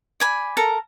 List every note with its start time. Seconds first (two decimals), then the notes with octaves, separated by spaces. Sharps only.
0.20 D5 G#5 B5
0.57 A4 A#4 A#5